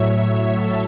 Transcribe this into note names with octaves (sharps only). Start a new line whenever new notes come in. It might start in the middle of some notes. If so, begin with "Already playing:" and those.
Already playing: A2 F#3 C#5 E5
A4